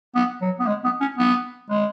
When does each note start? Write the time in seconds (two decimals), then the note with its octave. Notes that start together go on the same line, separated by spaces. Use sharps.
0.15 B3
0.41 F#3
0.59 B3
0.67 G#3
0.84 B3
1.01 C#4
1.18 B3
1.70 G#3